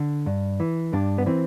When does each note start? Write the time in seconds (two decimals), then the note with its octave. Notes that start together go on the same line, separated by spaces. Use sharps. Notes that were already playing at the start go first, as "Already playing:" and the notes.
Already playing: D3
0.26 G2
0.60 E3
0.93 G2 D4
1.18 B3
1.26 E3 C4